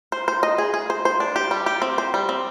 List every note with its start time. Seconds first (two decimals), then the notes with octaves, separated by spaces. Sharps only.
0.12 C5
0.28 C5
0.43 D#5
0.58 G#4
0.74 G#4
0.90 C5
1.05 C5
1.20 D4
1.36 G4
1.51 G3
1.66 G4
1.82 C4
1.98 C5
2.14 G3
2.29 C4